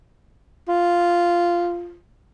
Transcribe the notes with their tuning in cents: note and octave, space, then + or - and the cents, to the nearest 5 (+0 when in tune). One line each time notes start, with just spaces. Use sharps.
F4 -5